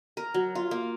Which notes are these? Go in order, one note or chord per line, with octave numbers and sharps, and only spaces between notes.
A#4
F#3
F4
A#3